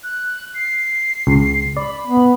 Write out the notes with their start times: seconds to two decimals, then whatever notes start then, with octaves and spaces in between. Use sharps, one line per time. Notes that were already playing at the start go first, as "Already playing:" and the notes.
0.04 F#6
0.55 C7
1.27 C#2
1.77 D5 B5
2.06 B3